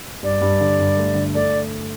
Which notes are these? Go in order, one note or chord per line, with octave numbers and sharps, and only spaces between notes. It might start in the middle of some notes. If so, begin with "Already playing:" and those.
G2 D5
G2
D3
G2
A3
D3
A3 D5